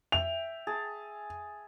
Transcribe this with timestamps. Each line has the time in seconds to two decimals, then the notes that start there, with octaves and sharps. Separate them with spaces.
0.12 E5 G5 F7
0.67 G#4 A5